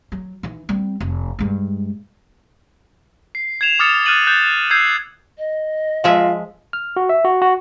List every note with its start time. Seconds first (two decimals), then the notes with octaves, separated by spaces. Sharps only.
0.12 F#3
0.43 E3 D#4
0.69 G3 C4
1.00 F1
1.39 G2 G#3
3.35 C7
3.61 G#6 C7 E7 F7
3.79 D6 D#6 F6 A6 C#7
4.06 D#6 F6 F#6 A6 D#7 F#7
4.27 F#6 G6 A6
4.70 E6 G6 G#6 C7
5.38 D#5
6.04 F3 G#3 F4 E5
6.73 F6
6.96 F#4
7.09 E5
7.25 F#4
7.42 F#4